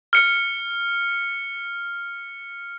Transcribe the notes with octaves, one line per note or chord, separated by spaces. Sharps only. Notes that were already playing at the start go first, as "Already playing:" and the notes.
F6 C#7